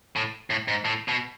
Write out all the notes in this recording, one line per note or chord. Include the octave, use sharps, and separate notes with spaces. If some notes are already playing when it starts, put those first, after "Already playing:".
A2
A2
G#2
A2
B2